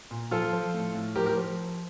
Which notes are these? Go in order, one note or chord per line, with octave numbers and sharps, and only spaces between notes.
A#2
F3 F4 A4
F3
A2
A2
F3 G4 A#4
G4 A#4
F3